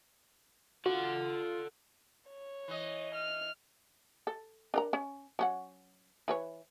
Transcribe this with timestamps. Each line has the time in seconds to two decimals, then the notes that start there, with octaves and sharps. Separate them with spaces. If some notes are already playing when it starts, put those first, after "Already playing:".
0.86 F4 F#4 A4 F#5
2.30 C#5
2.68 E3 D#5
3.14 F6
4.27 A4
4.74 D4 A#4 A#5
4.93 C#4
5.39 F#3 C#4 F#5
6.28 E3 B4 C#5